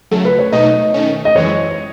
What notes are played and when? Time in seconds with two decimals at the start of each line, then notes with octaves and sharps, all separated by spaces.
0.11 C#3 F#3 A3 A4
0.25 B4
0.39 C#5
0.52 B2 A3 D#4 D#5
0.94 D#3 A3 C#4
1.25 D#5
1.35 F#2 E3 G#3 C#5